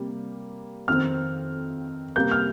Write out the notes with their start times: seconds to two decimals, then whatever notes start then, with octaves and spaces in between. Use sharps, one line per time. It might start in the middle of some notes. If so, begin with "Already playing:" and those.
Already playing: C3 G3 A#3
0.88 F2 D#3 C4 F6
2.16 C3 G3 A#3 G6
2.31 F6